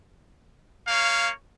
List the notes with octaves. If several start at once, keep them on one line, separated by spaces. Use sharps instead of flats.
A#3 C#5 F5